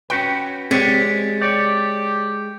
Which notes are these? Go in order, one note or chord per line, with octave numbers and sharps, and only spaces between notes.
C#4 F#4 B4 G5
G#3 C4 G4 C#5 D5
G4 C#5 D5